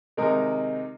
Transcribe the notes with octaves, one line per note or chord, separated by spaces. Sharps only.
C3 D#3 G#3 D#4 A#4